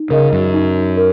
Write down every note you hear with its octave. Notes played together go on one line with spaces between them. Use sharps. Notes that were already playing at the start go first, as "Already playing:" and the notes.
Already playing: D#4
C#3 A#4 D#5
F#2
D#4
A#4